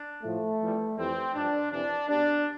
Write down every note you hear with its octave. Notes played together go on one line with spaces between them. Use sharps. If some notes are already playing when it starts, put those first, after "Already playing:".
Already playing: D4
A2 F3 A3
F2 E3 G3
F2 E3 G3 C4
G2 F3 D4
F2 C3 E3 D4
B2 G3 D4